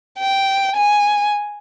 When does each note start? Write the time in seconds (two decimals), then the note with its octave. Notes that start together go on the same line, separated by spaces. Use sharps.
0.19 G5
0.76 G#5